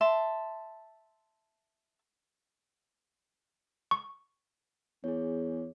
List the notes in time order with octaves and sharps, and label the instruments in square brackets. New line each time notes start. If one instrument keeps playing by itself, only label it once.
[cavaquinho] E5 A5 C6
[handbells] C#6
[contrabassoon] E2 [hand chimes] G#4 C#5